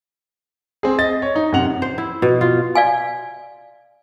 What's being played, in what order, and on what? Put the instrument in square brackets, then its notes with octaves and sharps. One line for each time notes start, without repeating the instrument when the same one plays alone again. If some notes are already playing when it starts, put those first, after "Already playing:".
[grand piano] C4 G#4
D#5 A6
C#5
D#4
F#2 C3 F#5 F7
[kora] C5
E4
B2
F4
[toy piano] D5 F5 G#5